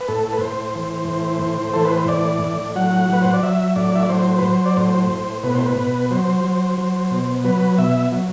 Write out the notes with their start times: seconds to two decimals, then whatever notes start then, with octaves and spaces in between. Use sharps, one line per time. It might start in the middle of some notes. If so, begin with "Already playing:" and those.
0.01 B4
0.08 A2 A4
0.33 B4
0.41 A2 C5
0.75 E3
1.08 A2
1.42 A2
1.74 E3 A4
1.85 B4
1.98 C5
2.08 A2 D5
2.42 A2
2.75 F#3 F#5
3.10 F#3 B4
3.22 C5
3.33 D5
3.43 F#3 E5
3.76 A2 D5
3.95 E5
4.03 D5
4.09 F#3 C5
4.38 B4
4.43 F#3 C5
4.66 D5
4.77 A2 C5
5.10 A2
5.43 B2 B4
5.55 C5
5.66 B4
5.77 B2
6.11 F#3 C5
6.44 F#3
6.78 F#3
7.11 B2
7.44 F#3 B4
7.78 B2 E5
8.12 F#3